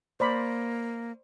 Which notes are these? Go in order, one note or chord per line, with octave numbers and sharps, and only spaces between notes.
A#3 C5 D5 B5